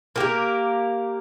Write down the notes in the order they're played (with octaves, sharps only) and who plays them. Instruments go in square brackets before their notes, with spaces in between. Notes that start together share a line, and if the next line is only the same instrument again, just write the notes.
[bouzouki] A#3 G4 A#4